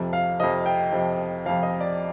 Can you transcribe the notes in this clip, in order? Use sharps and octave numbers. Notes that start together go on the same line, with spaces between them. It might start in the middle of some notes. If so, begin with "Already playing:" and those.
Already playing: F2 C3 F3
F5
F2 C3 F3 D#5
G5
F2 C3 F3
F2 C3 F3 F5
D#5
D5